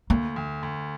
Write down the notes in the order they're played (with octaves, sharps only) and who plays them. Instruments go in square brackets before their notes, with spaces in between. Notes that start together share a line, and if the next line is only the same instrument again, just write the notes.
[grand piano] D2 [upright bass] A#3
[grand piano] D2
D2